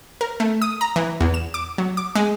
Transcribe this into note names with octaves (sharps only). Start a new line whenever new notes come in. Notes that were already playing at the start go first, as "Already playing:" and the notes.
A#4
A3
D#6
A#5
E3
E2
E7
D6
F#3
D6
G#3